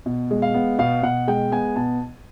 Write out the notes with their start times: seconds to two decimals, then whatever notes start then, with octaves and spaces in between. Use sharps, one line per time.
0.06 B2
0.31 G#3
0.42 F5
0.54 B3
0.79 B2 F5
1.03 B2 F#5
1.28 G#3 G5
1.52 B3 G#5
1.76 B2 A5